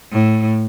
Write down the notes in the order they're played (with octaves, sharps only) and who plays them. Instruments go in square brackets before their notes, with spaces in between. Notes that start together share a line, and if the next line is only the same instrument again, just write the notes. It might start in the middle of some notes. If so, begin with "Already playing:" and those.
[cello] A2